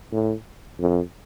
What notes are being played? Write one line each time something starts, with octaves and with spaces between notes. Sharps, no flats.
A2
F2